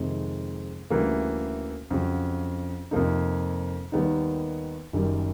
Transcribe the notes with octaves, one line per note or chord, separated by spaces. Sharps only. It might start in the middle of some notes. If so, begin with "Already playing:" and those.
Already playing: F2 C3 D#3 G#3
D2 C#3 E3 G3 A#3
F2 C#3 F#3
F2 C3 F3 A#3 D#4
D#2 D#3 G3 B3 D#4
F#1 F#2 D#3 G3